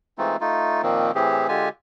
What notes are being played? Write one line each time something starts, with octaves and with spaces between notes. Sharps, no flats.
E3 G#3 A3 C4 D#4 F4
A3 D#4 F4
A#2 D#3 F3 A#3 C4
A2 E3 C4 G4 G#4
D3 G#3 F4 G4 G#5